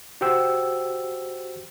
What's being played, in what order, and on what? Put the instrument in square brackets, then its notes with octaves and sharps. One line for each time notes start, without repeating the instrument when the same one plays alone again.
[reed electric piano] F#4 G4 C5 G5 E6